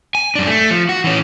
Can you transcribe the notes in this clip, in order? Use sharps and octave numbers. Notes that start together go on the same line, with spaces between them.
G#5
F#2 D4
A3
F3
F#4
E3 C#4